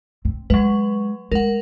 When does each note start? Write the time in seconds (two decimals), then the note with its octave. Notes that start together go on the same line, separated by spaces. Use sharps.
0.25 C4
0.50 F#3 G#3 B4
1.32 G#3 A#4 F#5